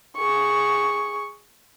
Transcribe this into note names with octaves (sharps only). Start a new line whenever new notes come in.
G#4 C#6